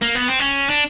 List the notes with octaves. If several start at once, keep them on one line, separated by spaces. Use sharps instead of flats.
A#3
B3
C4
C#4
D4